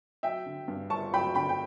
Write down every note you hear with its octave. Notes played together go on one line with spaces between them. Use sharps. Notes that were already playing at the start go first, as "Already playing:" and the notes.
F#3 E5 G5
D3
G2
G1 A5 C#6
F#3 G5 B5
D3 G5 B5
G5